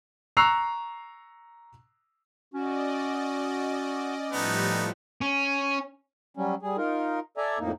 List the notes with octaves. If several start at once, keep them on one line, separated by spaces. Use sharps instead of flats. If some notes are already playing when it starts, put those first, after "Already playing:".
A#5 C#6 E6 F#6 C7 F7
C#4 F#4 D5 D#5
A2 F3 G3 A3 B3 D#4
C#4
F#3 G3 C#4
G3 G#4
D#4 F4 A#4
A4 D5 E5 G#5 A#5
F2 A2 A#3 D#4